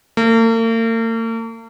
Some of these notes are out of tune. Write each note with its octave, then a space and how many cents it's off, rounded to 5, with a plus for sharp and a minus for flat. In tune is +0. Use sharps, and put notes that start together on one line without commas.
A#3 -45